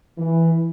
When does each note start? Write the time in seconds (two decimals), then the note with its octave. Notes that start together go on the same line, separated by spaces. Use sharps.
0.18 E3